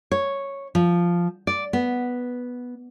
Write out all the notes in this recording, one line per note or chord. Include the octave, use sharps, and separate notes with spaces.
C#5
F3
D5
B3